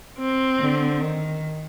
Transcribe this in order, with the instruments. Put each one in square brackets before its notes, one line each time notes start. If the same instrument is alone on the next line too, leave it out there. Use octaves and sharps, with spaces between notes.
[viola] C4
[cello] D3
D#3